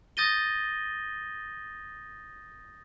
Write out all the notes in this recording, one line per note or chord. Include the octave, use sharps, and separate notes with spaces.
D#6 G6 A6 A#6 D#7 G7